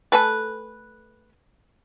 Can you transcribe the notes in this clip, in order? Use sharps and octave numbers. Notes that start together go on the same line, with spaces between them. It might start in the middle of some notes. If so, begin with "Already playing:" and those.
A3 A4 B4 G#5